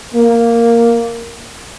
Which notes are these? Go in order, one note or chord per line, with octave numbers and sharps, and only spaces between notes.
A#3